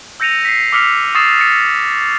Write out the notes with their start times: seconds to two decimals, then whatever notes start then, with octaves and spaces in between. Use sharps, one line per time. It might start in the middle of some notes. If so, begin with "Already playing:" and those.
0.20 E6 G6 A#6 C#7 D#7 F7
0.45 B6 C7
0.72 D6 E6 F6 B6 C#7 F7
1.15 C#6 D#6 E6 A6 C7 E7
1.40 A6 C#7